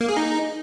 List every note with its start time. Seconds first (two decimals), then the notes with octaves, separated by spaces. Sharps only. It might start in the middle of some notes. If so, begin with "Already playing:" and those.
0.01 A#3
0.09 G#4
0.17 D#4